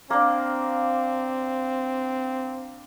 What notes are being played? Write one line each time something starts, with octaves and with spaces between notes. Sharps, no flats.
A#3 C4 D4